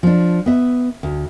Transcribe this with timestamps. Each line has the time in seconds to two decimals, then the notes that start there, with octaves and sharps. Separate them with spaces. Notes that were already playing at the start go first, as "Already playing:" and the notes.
0.03 F3 D4
0.46 B3 E5
1.03 D2